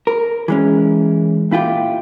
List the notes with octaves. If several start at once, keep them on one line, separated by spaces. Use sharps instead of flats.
A#4
E3 G#3 C#4
A#2 E4 F4 G4